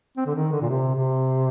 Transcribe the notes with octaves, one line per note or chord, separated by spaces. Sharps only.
C4
D3
D#3
D3
A#2
C3
C3